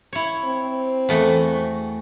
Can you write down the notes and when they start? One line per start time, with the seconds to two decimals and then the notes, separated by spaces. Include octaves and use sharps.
0.13 E4 C#5
0.45 C4
1.09 E2 A3 F#4